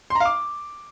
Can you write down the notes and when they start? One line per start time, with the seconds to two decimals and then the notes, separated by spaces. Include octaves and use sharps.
0.10 C6
0.15 A#5
0.20 F5
0.25 D6